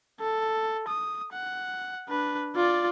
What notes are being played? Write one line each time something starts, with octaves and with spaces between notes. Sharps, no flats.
A4
D#6
F#5
D4 B4
F4 D5